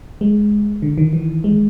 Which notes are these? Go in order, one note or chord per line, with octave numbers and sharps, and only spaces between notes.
G#3
D3
D#3
E3
G#3